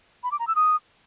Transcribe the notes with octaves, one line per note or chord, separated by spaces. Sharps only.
B5
D6
A#5
E6
D#6